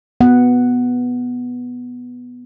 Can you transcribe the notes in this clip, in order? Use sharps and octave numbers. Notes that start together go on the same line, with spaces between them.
B3 F#5